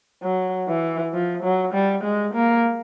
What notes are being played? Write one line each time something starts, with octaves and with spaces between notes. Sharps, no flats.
F#3
E3
F3
F#3
G3
G#3
A#3